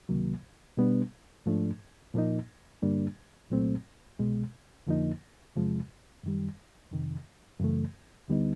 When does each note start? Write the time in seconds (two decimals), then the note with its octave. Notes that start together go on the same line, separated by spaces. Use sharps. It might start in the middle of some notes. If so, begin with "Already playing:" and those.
0.09 C#2 C3 D#3 F#3 A#3
0.77 B2 G3 B3 D4
1.46 G#2 F3 A3 D4
2.14 A#2 F3 A#3 D#4
2.82 G2 D3 G3 A#3 D4
3.50 C2 A#2 F#3 A3 C4
4.19 C2 B2 G#3
4.87 F2 D3 F3 A#3 D#4
5.56 E2 C3 F3 G#3
6.23 F#2 D#3 G3
6.92 F2 C3 D#3
7.60 F#2 C#3 E3 A3
8.28 D2 D3 G3 B3 D#4